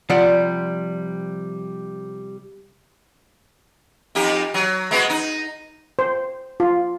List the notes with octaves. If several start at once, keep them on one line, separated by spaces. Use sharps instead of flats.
C3 F3 G3 D5 F#5
F2 D#4 G4
F#3
G#3 B3 F#4
D#4
C5
F4